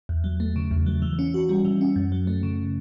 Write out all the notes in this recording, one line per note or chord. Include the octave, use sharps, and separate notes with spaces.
E2
F#3
A3
C#3
E2
F#3
E3
C#4
F#4
G3
E3
C#4
F#2
F#3
A3
C#3